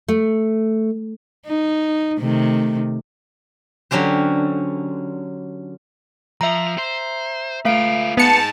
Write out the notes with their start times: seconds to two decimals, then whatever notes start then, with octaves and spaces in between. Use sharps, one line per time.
0.08 A3
1.47 D#4
2.20 C3 D#3 A3
3.91 D3 F#3 C#4 G4 C5
6.41 F3 E5 A#5
6.78 C5
7.65 A3 F4 B4 F5 D7
8.17 B3 D#4 G#4 A5 C#7